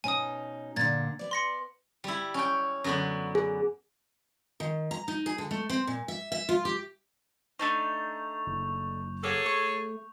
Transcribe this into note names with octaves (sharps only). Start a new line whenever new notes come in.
B2 C#4 D#4 G#5 D#6
A#2 D3 G#6 A6
B3 D5
C6 A#6 C#7
G3 E4
C#4 G5
F#2 D3 B3
G#4
D#3
A#5
D#4
G#4
D3
A3
C4
A#2
E5
E5
F4
G4
A3 D4 D#4 C#6 G6 F7
F#1
A#3 F#4 G#4 A4 C#5
A3 C#6